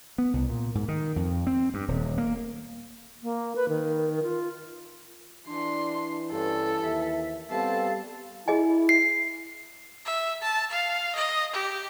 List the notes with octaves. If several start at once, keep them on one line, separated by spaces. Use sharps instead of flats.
B3
C2
A#2
G#2
D#3
F2
C4
G2
D#1
A#3
A#3
B4
D#3
F4
E3 D4 C6
G2 C#4 A4
D#2 E5
G3 B3 C4 A4 F5 A5
E4 G#4 D#5 G#5
C7
E5
A5
F5
D#5
G4